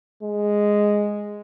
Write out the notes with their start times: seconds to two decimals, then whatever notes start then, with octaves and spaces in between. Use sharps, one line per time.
0.23 G#3